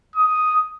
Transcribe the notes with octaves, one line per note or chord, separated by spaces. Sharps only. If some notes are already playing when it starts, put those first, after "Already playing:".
D#6